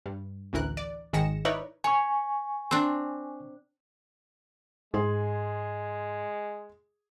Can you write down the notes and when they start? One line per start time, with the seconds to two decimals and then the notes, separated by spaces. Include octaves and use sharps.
0.06 G2
0.53 A1 D2 E3 A#4 F#6
0.77 D5
1.13 G#1 D#3 G#3 A#6 C#7 E7
1.45 D#4 E4 A#4 B4 C#5 D5
1.84 C#5 G#5 C#6
2.71 C4 D4
4.94 G#2 G#3 G#4 C6